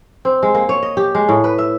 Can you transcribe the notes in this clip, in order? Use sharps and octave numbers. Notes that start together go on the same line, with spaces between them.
C4
G#3
A#3
C#5
D#5
G4
G#3
A2
B4
E5